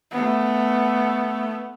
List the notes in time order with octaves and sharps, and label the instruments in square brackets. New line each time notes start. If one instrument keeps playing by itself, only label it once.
[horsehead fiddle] A3 B3